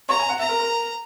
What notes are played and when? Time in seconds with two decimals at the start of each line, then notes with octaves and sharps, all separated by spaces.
0.09 C#5 A#5
0.19 G#5
0.29 F#5
0.39 E5 A#5
0.49 A#4
0.59 A#4